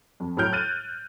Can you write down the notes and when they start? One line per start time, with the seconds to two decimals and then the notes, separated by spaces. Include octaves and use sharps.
0.20 F2
0.37 A2 F#3 F6 G6 D7
0.53 F#6 A6 D#7